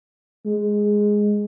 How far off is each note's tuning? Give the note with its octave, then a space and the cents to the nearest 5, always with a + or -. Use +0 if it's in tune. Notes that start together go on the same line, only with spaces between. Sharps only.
G#3 +0